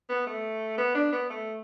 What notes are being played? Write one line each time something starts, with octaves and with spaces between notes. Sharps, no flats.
B3
A3
B3
D4
B3
A3